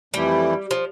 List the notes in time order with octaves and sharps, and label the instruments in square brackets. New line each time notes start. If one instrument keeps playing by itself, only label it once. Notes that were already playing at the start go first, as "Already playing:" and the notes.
[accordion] F2 E3 A3 E4 [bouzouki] G3
[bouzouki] F3